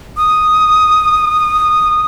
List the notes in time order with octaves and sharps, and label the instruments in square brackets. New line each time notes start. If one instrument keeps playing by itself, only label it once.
[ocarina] D#6